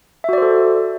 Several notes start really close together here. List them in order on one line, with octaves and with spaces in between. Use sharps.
E5 F#4 D5 C5 A4